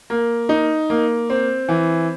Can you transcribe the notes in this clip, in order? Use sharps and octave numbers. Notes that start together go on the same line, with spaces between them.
A#3
D#4
A#3
C4
E3